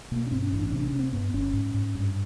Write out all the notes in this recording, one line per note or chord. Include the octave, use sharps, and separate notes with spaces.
B2 A#3
C#4
G2 C4
C#4
A1 D4
C#4
C3 D4
C#4
C3
C4
G2 B3
G1 C#4
G#2
G#2
G2